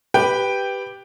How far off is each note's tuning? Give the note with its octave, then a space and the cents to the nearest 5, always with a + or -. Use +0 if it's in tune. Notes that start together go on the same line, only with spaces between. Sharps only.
G4 +0 B4 +0 G5 +0